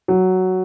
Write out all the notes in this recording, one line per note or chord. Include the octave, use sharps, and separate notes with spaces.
F#3